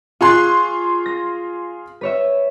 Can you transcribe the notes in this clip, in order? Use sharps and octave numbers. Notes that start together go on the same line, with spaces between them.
F4 G#4 C6 C#6 F#6 C7
A#6
B4 C#5 E5